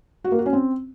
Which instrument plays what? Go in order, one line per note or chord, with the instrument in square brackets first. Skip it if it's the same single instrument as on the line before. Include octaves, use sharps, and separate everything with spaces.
[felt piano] F#4
A#3
F#4
C#4
C4